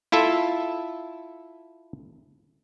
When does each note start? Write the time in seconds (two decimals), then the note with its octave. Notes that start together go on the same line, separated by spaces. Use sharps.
0.12 E4 F4 A4 E5